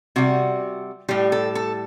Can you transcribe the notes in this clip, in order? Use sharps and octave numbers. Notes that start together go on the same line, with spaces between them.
C3 G3 F#4
A2 G3 G4
A4
A4